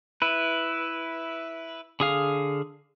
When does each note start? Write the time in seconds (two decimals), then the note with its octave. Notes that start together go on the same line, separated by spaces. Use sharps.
0.22 E4 B4
2.00 D3 G#4 F5